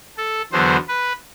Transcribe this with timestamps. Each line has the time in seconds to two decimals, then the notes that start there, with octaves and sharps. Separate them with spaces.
0.17 A4
0.52 E2 D3 F#3 B3 C5
0.88 B4